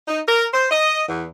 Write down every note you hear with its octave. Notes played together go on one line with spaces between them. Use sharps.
D#4
A#4
C5
D#5
E2